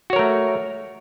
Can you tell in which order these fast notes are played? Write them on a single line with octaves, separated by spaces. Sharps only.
F#4 C#5 A#4 A3